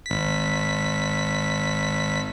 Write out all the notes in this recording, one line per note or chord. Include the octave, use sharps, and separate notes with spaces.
G#1 B6